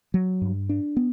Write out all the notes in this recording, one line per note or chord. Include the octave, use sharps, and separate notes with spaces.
F#3
G2
D4
B3